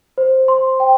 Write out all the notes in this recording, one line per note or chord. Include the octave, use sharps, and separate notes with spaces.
C5
C6
G5